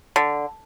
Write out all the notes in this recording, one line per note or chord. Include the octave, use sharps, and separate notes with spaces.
D3